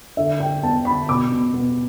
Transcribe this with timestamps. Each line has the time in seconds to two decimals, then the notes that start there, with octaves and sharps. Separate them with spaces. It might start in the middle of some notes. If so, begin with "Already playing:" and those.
0.17 D3 E5
0.40 D3 G5
0.63 B3 A5
0.85 D3 B5
1.09 B2 D6
1.32 B2
1.54 B3